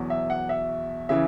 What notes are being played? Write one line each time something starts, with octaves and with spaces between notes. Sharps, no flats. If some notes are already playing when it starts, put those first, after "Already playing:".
Already playing: E2 B2 F#3
E5
F#5
E5
C#3 E3 E5